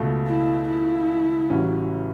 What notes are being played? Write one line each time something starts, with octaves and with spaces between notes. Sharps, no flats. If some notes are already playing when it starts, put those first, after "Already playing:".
Already playing: C#2 B2 A3
E4
E4
A1 A2 G3 C#4 F#4